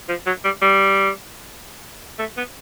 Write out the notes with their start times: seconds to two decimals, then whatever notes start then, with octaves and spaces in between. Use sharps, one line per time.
0.09 F3
0.26 F#3
0.44 G3
0.62 G3
2.19 A3
2.37 B3